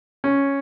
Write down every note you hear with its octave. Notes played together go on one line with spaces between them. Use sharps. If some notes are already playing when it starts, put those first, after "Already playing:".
C#4